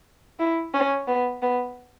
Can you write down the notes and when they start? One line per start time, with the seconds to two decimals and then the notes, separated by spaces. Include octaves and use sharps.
0.39 E4
0.74 C#4
1.08 B3
1.42 B3